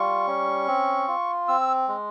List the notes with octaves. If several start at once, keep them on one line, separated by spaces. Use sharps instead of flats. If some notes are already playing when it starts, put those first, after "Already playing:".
Already playing: G3 F4 C#6
C#4
C4
F4
C4 E6
G#3